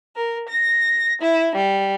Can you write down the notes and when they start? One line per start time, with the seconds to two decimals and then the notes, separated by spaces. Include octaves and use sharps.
0.16 A#4
0.48 A#6
1.22 E4
1.55 G3